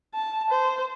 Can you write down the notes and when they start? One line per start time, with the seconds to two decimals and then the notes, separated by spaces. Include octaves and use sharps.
0.15 A5
0.50 C5